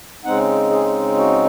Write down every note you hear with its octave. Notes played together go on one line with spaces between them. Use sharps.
C#3 G#3 C4 D#4 F#5
G#4
F#4